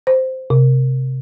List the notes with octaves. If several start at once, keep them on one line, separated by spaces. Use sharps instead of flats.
C5
C3